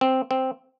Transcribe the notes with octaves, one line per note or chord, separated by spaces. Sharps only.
C4
C4